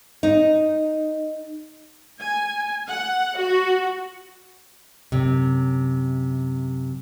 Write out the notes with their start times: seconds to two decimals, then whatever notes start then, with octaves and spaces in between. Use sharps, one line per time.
0.23 D#4
2.20 G#5
2.88 F#5
3.36 F#4
5.12 F#2 C3